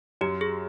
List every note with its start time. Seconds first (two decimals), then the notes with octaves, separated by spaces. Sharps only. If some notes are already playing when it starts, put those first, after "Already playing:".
0.21 F#2 G4
0.41 G#4